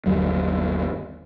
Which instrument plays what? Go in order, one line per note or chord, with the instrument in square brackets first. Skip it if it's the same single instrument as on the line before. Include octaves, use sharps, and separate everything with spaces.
[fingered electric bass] G1 D#2 F#3 G3